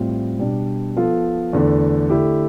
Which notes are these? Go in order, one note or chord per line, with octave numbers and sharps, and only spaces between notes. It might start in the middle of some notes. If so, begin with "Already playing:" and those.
Already playing: A2 G3 C4 F4
B2 G3 D4
F3 B3 F4 A4
E2 D3 A3
D3 A3 E4 G4